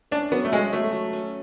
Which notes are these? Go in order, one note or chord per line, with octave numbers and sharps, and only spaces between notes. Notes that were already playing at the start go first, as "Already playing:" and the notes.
C#4 D4
F#3 B3
A3
G#3 F#4
F#3 A3
F#3
C#4